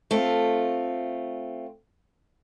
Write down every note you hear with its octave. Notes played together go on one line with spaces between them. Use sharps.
A3 C4 F4